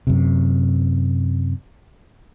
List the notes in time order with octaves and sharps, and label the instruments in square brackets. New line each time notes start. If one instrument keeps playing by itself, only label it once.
[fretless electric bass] F#2 C3